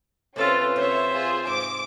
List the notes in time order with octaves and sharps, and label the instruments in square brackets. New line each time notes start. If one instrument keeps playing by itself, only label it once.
[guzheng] C3 B4 C5 [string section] C#4 [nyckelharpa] F4 A4
[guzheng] C3 [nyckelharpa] C5 E5 [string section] C#5
[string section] F4 G#4
[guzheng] G#2 [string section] D6